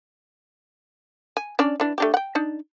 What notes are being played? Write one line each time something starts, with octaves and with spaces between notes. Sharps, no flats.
G#5
C#4 D4 D5
E3 D4
A3 D4 G4
F#5 G5
D4 D#4